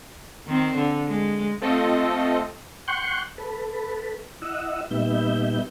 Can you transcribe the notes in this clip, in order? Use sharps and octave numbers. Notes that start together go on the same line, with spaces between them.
D#3 C4
D3
G#3
A3 C4 F4 A4 D#5
F#5 G5 C6 C#6 F#6 G6
A4 B4
E4 D#5 F#5 E6
A#2 G3 B3 D#4 E5 G6